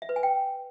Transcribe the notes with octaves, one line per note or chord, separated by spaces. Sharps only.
E5
B4
G#5
G5